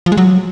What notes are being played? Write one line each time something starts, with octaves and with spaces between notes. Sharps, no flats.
F3
G#3
F#3